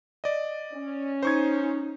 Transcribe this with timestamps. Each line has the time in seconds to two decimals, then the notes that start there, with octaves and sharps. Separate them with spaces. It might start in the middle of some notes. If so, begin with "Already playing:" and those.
0.24 D5 D#5
0.73 C#4
1.23 D#4 C5 C#6 G#6